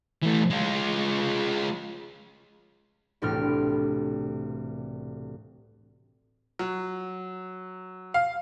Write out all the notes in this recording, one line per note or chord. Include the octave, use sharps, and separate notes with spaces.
E3 A3
G#3 F4
E1 C2 A2 D4 F6 D7
F#3
F5